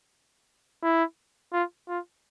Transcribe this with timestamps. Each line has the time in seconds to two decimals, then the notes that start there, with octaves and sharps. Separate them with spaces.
0.83 E4
1.53 F4
1.88 F4